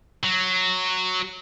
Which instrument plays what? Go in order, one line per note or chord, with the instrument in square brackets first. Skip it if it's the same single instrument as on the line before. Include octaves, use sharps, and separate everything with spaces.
[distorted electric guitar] F#3